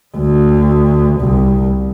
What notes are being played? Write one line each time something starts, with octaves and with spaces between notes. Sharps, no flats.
D2
C2